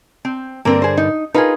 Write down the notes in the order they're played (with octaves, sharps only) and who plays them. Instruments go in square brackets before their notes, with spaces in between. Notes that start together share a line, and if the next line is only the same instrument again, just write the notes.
[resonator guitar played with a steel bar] C4
[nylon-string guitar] G2 D3 A#4 [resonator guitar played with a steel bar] A#3 C4
[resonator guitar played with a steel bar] G#4 C5
D#4
[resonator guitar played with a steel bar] D#4 F4 G#4 [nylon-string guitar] A#4 B4